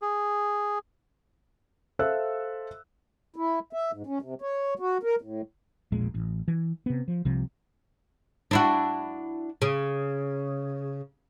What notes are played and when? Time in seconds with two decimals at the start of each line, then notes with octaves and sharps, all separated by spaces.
0.02 G#4
1.99 A4 C5 E5 F5 E6 F#6
3.36 E4
3.73 E5
3.92 G#2
4.07 C#4
4.22 C3
4.42 C#5
4.79 F#4
5.03 A#4
5.21 A2
5.92 E1 A#1 A#2 G#3
6.14 A1
6.48 E3
6.86 C3 B3
7.08 F3
7.25 C2 C3 F3
8.51 D4 E4 F#4
9.62 C#3